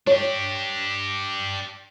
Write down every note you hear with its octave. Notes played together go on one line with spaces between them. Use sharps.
D4 G4 C#5